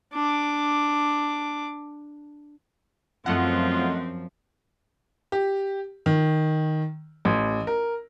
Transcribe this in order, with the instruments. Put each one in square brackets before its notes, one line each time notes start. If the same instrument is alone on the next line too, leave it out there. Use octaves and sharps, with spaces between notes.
[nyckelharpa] D4 D6
[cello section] F#2 F3 [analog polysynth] A3 D#5 F#5 [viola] C4 [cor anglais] F4
[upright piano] G4
D#3
A1
A#4